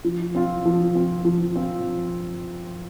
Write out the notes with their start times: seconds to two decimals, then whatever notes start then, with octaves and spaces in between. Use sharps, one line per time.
0.04 F3
0.35 C4 F4
0.65 F3
0.94 C4 F4
1.25 F3
1.56 C4 F4